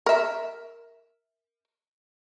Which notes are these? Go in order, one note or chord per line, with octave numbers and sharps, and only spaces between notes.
A#4 E5